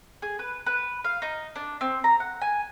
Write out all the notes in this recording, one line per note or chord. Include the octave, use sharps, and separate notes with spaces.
G#4
B4
B4
F5
D#4
D4
C4
A#5
F#5
G#5